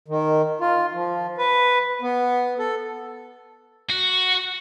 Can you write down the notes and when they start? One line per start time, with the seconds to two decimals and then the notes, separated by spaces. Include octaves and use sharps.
0.08 D#3
0.60 F4
0.93 F3
1.38 B4
2.02 B3
2.59 A4
3.89 F#4